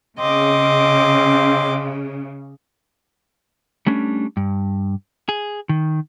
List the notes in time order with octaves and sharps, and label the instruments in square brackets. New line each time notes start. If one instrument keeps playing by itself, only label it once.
[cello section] C#3 [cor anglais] C4 [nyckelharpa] D#5 D6
[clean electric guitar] G3 A3 C#4 D4
G2
G#4
D#3